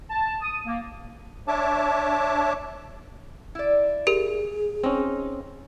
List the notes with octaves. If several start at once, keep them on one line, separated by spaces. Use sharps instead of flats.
A5
D#6
A#3
D4 C#5 E5 A5 D6
E4 D5
G4 G#4 A#4
C4 C#4 D#4